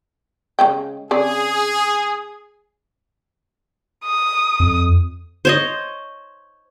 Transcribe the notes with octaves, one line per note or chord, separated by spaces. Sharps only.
C#3 G#3 G5
C#3 C4 G#4 D5
D#6
F2
C5 C#5 D#5